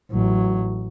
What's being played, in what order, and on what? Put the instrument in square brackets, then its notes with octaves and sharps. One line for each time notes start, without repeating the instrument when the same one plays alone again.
[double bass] A1 F#3